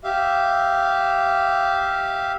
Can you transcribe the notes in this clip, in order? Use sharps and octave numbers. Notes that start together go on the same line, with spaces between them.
G4 E5 F5